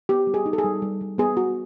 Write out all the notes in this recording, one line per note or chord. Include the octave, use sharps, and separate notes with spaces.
B3 G4
G3
G#4
D#4
A4
G#4
G3
G3
G3
B3 G#4
F#4